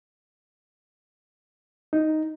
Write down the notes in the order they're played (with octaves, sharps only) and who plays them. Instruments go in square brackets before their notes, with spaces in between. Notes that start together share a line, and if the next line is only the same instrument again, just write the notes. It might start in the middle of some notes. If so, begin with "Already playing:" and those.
[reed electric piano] D#4